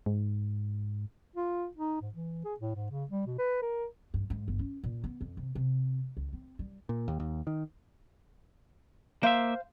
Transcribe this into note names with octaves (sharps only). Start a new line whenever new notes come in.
G#2
F4
D#4
G#2
E3
G#4
A2
G#2
C#3
G3
B2
B4
A#4
G2
G#2
G1
C#4
A#2
B3
F2
C3
C3
C#2
C4
G3
A#2
D#2
D#2
D#3
A#3 C5 E5 F5